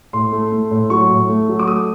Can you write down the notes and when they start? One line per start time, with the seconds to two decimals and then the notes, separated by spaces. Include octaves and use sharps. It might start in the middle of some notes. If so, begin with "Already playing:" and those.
0.13 A2 C6
0.32 A3
0.52 A3
0.71 A2
0.90 F#3 C#6
1.09 A2
1.29 A3
1.48 F#3
1.59 D6
1.67 A3 D#6